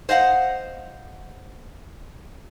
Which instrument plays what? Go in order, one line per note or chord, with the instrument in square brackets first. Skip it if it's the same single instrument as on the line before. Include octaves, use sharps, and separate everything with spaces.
[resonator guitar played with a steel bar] C5 D#5 F5 F#5